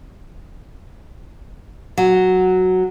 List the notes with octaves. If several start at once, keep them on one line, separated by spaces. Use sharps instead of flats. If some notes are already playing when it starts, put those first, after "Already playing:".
F#3